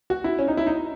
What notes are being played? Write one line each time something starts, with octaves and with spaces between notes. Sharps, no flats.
F#4
E4
C#4
D#4
E4
D#4